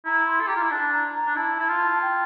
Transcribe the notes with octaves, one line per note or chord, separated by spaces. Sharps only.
E4 A#5
C6
A4
G4 A#5
F4
E4
D4 A5
A#5
A#5
D4
E4 A5
E4
F4
G5